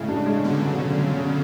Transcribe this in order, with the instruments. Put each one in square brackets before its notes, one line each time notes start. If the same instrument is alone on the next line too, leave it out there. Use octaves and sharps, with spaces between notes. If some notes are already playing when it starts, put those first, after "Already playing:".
Already playing: [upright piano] A2 G#3 [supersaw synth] C#3
[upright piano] D4
G#3
[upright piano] B2 [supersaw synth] D3
[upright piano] F#3
C#4
F#3
C#3